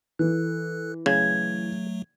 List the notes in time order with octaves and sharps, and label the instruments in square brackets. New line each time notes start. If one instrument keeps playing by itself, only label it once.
[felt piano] E3 [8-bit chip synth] A4 F#6
[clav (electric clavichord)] C#3 [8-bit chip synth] F#3 A3 [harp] G#6